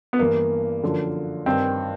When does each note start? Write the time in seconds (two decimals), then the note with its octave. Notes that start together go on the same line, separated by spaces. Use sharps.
0.13 B3
0.19 G2 E3 A#3
0.83 F#2 D3 F3
1.46 G2 D#3 C4